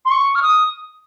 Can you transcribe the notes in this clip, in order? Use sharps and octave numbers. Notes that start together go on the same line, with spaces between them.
C6
C#6
F6
D#6